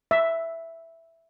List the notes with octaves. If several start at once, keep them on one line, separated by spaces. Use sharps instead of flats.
E5